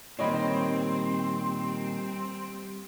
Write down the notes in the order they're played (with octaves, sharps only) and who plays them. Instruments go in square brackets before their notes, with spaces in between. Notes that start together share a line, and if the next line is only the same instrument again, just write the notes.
[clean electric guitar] A#2 D#3 [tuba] G3 [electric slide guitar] C4 [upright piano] C#5 D#5 B5